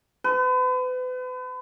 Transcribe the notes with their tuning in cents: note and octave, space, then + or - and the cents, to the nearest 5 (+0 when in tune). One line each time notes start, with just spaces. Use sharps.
B4 +40